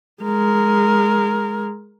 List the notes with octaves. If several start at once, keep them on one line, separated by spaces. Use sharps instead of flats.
G#3 A#4